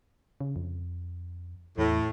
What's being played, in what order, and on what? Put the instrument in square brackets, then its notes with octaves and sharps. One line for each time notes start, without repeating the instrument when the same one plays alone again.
[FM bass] C#3
F2
[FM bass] E2 [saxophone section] A2